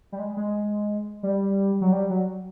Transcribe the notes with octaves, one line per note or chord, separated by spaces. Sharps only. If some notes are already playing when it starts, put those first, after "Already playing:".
G3
G#3
G#3
G3
F#3
G3
F#3